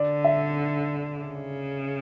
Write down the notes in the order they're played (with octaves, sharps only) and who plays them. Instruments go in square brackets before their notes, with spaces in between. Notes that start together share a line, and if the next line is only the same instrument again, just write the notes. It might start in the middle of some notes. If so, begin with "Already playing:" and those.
Already playing: [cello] D3 [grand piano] D5
[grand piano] E5
[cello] C#3